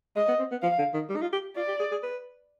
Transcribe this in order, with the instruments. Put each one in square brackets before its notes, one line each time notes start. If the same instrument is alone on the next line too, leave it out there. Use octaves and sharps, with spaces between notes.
[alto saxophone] G#3 [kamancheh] D#5
[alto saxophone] B3
C4
B3
[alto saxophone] F3 [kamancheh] F5
[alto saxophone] D3
D#3
G3
D#4
F4
G4
[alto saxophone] F4 [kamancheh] D5
[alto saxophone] G4
G#4
G#4
B4